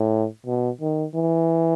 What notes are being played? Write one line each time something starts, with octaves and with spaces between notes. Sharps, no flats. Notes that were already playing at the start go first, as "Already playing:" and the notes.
Already playing: A2
B2
D#3
E3